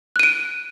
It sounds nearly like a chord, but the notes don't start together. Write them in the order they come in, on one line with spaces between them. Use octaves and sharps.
F#6 D#7 D7